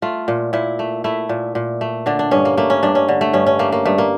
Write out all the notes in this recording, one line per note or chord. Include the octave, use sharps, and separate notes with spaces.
A3 F4
A#2
A#2 E4
A3
A3 E4
A#2
A#2
A3
D3 D4
D4
G2 C#4
A#3
A3 A#3
C#4
G2 D4
C#4
D3
A3
G2 C#4
C#4
A3 A#3
A#3
G2 A3
A#3